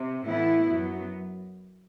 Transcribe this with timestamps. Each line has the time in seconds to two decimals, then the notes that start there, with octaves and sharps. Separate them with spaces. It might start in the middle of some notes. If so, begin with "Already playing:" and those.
Already playing: C3
0.25 A2 E3 B3 E4
0.64 F#2 F#3 B3